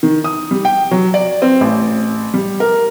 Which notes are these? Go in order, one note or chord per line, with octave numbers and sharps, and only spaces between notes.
D#3
D#6
G3
G5
F#3
D5
C4
A1
G3
A#4